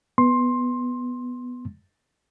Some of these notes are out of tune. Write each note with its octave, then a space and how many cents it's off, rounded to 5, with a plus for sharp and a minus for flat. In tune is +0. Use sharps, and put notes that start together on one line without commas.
B3 +0 C6 +15